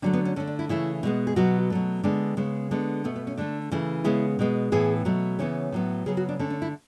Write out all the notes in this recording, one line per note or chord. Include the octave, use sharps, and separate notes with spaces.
D3 F#3 A3 C#4
B3
C#4
D3 A3 C#4
D4
E4
C#3 E3 A3 E4
B2 G#3 B3
G#4
B2 F#3 B3 F#4
B2 F#3 A3
D3 G#3 B3 D4
C#3 G#3 B3
D3 G#3 B3
B2 A3 B3
B3
C#4
D3 A3 D4
C#3 E3 A3
C#3 G#3 B3 E4
B2 G#3 B3
A2 E3 B3 G#4
B2 F#3 A3
C#3 E3 B3 C#5
A2 F#3 B3
C#3 F#3 B3 G#4
F#4
D4
D3 A3 C#4
C#4
E4